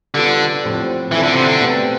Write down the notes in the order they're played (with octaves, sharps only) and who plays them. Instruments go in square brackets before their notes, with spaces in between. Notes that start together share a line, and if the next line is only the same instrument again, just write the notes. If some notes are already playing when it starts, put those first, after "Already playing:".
[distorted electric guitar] D3 [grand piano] G3 B3 F4 A4
[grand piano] A2 F3 C4 G4
[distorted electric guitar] E3 [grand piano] F3 C4 E4 A4
[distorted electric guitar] D3
C3
D3
[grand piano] B2 A3 C4 G4 B4